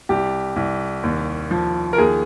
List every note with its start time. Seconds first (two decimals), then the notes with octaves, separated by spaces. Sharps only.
0.09 C2 G4
0.56 C2
1.03 D#2
1.51 F3
1.93 A#4
1.98 D#2 G#4